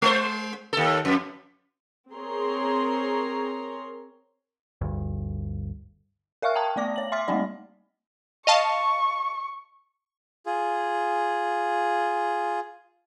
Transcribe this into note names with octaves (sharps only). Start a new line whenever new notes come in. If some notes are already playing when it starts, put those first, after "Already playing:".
G#3 C5
D#2 A4
F2
C4 G#4 A#4 C#5 A#5 C6
G1 D2 G2
A#4 E5 F5 C#6 F6 F#6
G5 A5 A#5 D#6 G#6
A3 B3 D5 D6 A#6
C#5 F#7
E5 C6 D6 F6 A6 B6
G3 A3 A#3 C4 D#4 D5
D#5 F5 A5 C#6
F4 G#4